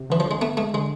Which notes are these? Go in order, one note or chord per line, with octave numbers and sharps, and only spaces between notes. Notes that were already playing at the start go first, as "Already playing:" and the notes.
Already playing: C3
D3 E3
F3
D3 G#3
A3 B3
G#3 A3
D3 G#3